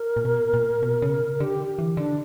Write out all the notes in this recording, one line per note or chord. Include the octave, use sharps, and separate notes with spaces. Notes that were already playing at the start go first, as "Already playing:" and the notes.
Already playing: A#4
A#2
B2
A#2
B2
C#3
D3 G4
E3
D3 D4